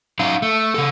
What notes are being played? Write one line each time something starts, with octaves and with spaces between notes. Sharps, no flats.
F#3 C#4 D#4 F5
A3
C#3 E3 A4